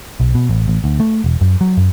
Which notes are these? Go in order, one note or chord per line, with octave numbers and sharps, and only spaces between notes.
B1
B2
A1
A1
D2
A3
E1
F#2
F#3
F#2